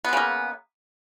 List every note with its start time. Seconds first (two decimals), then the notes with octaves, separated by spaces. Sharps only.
0.04 B3
0.09 G#3
0.13 C#3
0.17 A#3